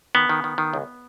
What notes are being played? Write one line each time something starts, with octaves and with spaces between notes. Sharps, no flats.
D#3 B3
D#3
D#3
D#3
C#2